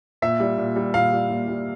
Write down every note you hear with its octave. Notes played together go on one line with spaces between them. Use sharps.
A#2 E5
G3
A#2
G3
A#2 F5
G3
A#2
G3